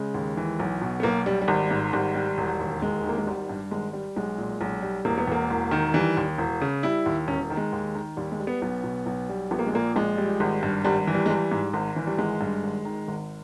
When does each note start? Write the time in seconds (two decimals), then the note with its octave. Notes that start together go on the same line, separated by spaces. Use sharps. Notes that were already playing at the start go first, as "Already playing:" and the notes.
Already playing: C#3 G#3
0.14 D#2
0.37 E3
0.59 B1
0.81 B2
1.00 B3
1.03 B1 A#3
1.26 G3
1.42 G3
1.48 G#1
1.71 G#2
1.93 G#1 G3
2.15 G3
2.38 E1
2.59 D#2
2.82 E1 G#3
3.04 D#3
3.09 A#3
3.18 G#3
3.27 G#1 G3
3.49 G2
3.71 G#1 G#3
3.93 G3
4.16 B1 G#3
4.38 A#2
4.61 B1
4.82 G3
5.05 E1 A#3
5.18 B3
5.28 E2 A#3
5.50 E1
5.71 D#3
5.94 E3 G3
6.17 D#2
6.38 E1
6.61 C#3
6.83 G3 E4
7.06 D#2
7.28 E1 C#4
7.50 D#3
7.57 G#3
7.73 D#2
7.95 D#3
8.17 D#2 G3
8.32 G#3
8.40 G3
8.47 B3
8.62 B1 B3
8.84 B2
9.06 B1
9.29 G3
9.51 A#1 B3
9.59 A#3
9.67 G#3
9.73 A#2 A#3
9.96 A#1 G#3
10.17 G3
10.40 G#1
10.63 G2
10.85 G#1 G3
11.07 E3
11.14 G3
11.26 G#3
11.30 G3
11.51 G#2
11.74 G#1
11.96 E3
12.07 G3
12.18 G#1 G#3
12.41 G2
12.63 G#1
12.85 D#3
13.08 G#1